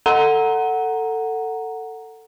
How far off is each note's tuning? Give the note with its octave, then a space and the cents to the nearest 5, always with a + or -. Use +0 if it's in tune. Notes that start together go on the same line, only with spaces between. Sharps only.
A4 +20 F#5 +0 A#5 +0